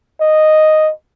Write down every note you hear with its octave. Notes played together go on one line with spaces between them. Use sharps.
D#5